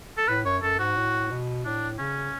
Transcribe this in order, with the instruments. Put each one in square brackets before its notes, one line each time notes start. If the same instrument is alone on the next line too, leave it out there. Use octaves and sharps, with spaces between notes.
[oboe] A4
[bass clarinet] A2 [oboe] B4
[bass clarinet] F#2 [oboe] C#5
[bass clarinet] F#2 [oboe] A4
[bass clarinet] G#2 [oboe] F#4
[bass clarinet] A2
B2
[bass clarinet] A2 [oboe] D4
[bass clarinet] C#3 [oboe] C#4